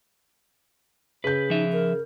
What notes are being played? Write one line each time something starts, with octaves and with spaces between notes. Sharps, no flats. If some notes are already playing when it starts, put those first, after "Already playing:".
C#3 B4 G6
F3 D#4 E5
A#4